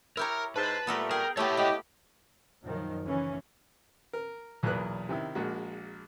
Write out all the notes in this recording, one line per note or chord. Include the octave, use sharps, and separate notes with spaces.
E4 G4 A#4 C#5 A#5
G#2 B4 C5 A5
A#2 G3 A3 B3 A4 A#4
G#4 A#4 G5
A3 B3 E4 G4 C#5 A5
B3 G4 D#5
F#2 A#2 D#3 F3 F#3
C#3 E3 C#4
A#4
B1 E2 A#2 A#4 B4 F#6
C3 D#3 E4
A#1 G#3 A#3 F#4